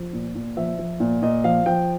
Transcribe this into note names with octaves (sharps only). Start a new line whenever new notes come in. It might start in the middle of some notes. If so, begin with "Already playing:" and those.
Already playing: F3
A#2
A#2
F3 E5
F3
A#2
A#2 D#5
F3 F5
F3 G5